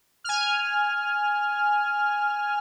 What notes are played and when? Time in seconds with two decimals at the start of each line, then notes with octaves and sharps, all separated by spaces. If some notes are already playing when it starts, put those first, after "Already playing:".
0.24 G#5 F6